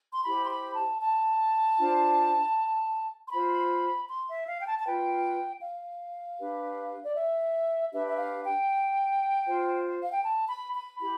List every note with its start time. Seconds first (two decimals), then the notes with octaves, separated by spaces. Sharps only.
0.14 C6
0.24 E4 G4 C5 B5
0.44 C6
0.50 B5
0.76 A5
1.01 A5
1.78 D4 F4 C5
3.27 C6
3.31 F4 C5 B5
4.09 C6
4.28 E5
4.47 F5
4.60 G5
4.66 A5
4.78 A5
4.85 F4 B4 G5
5.62 F5
6.39 D4 G4 B4
7.04 D5
7.16 E5
7.92 D4 G4 B4 E5
8.07 E5
8.18 F5
8.44 G5
9.47 F4 C5
10.03 F5
10.12 G5
10.23 A5
10.48 B5
10.74 B5
10.99 E4 G4 B5